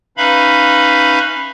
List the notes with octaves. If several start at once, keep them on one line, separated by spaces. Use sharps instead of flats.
C#4 D#4 B4 E5 F5 B5